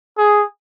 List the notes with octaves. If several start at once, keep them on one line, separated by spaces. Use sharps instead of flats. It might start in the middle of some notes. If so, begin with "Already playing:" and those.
G#4